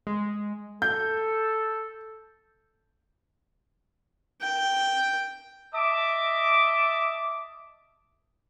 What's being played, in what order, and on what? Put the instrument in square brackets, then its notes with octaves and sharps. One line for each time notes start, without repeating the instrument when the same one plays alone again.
[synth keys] G#3
[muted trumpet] A4 [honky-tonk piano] G6
[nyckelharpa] G5
[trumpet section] D#5 E5 A5 D6